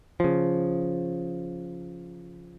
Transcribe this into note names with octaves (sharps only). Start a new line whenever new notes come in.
C#3 F3